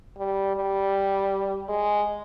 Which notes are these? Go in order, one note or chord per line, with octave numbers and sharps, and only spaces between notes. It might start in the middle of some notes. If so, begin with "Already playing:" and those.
G3
G3
G#3